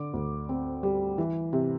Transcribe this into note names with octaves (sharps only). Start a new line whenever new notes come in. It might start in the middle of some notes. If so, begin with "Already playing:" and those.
Already playing: D3 D6
D2
C4
G3
E3
C3